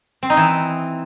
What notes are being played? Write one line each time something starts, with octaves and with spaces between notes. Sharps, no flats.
C4
D#4
E3